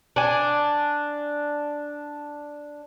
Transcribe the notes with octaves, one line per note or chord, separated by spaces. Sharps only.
D4 G#5